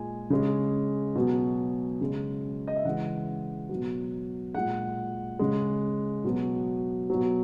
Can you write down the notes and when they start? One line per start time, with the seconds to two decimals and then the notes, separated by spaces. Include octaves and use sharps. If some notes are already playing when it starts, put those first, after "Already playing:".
Already playing: A#2 G#3 G#5
0.30 C#3 G#3
1.15 B2 F#3
2.01 C#3 G#3
2.68 D#5
2.76 E5
2.85 C#3 E3 G#3 F#5
3.69 F#3
3.75 B2
4.54 A#2 G#3 F#5
5.39 C#3 G#3
6.24 B2 F#3
7.10 B2 F#3